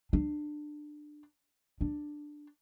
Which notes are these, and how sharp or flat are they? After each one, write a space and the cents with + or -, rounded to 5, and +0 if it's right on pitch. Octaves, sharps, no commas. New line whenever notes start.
D4 +20
D4 +10